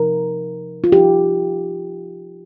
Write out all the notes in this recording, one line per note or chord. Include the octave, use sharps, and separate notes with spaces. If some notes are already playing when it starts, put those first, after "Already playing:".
Already playing: C3 F3 D#4 A#4
F4
F3 D#4 G4